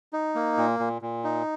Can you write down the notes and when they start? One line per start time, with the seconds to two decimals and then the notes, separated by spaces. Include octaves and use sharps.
0.13 D#4
0.35 A#3
0.58 A#2
0.79 A#2
1.02 A#2
1.24 D#4